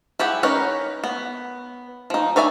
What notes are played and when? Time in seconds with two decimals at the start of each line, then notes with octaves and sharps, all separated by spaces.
0.19 E4 G4 G#4 F#5
0.43 C#4 D#4 A#4 B4 C#5
1.04 B3
2.10 F3 D#4
2.36 B4 C#5 D5 E5 G#5